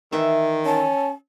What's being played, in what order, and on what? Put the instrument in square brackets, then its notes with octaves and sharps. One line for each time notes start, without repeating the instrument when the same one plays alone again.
[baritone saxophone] D#3 [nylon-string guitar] E3 E5
[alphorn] C#4 [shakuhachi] A5